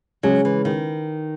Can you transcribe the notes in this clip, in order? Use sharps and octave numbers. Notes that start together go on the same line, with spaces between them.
C#3 F#3 G#3 C#4
E3
D#3